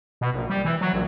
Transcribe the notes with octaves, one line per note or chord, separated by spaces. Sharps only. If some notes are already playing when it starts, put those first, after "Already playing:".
B2
A#1
G3
E3
F#3
A#1